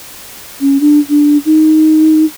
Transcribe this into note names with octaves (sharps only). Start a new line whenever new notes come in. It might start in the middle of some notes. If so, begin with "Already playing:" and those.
C#4
D4
D4
D#4